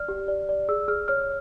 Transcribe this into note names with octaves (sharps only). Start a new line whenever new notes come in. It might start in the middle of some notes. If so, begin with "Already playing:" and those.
Already playing: D5 F6
G4
D5
D5
G#4 E6
G#4 F6
C#5 F6